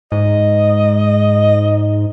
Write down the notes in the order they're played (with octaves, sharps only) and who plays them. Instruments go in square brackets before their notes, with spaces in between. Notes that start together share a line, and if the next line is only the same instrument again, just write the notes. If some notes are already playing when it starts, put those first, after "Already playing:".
[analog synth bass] G#2 [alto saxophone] D#5